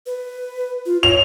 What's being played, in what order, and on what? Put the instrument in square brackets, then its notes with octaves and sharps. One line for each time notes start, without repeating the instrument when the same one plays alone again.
[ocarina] B4
F4
[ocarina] C#5 [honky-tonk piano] F7